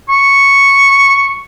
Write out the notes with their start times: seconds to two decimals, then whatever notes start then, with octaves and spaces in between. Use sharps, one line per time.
0.09 C#6